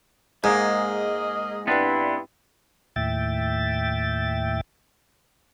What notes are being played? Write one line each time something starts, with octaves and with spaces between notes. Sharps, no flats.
G#2 G#3 A#3 G#4 A#4 D#5
G2 B3 C4 D4 E4
D#2 A2 E5 G5 A6